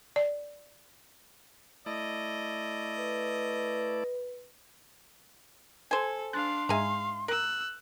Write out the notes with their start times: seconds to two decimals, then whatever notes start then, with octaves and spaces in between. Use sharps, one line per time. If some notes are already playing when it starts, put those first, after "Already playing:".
0.16 D5
1.86 A3 E4 D5 D#5
2.98 B4
5.91 A4 C5 G#5
6.33 D4 F5 C6 F#6 A6
6.69 G#2 G#3 E5 F5 G#5 A#5
7.28 A#4 E6 F#6